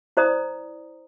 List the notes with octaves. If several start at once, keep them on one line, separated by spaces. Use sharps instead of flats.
E4 C5 D5 A#5 D#6